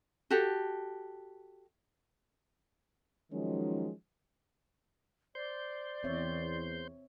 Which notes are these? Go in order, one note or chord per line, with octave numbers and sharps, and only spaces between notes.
F#4 G4 A4
D#3 F3 F#3 G#3 C#4 D#4
C5 D5 C6 G6
E2 C4 C#5 E5